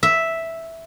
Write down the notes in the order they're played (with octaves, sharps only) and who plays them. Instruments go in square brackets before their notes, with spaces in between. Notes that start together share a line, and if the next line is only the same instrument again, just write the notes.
[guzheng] E5